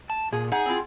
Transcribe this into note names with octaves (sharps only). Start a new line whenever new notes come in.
A5
A#2 G#4
D#4 G#4 F#5
C4 E4 F4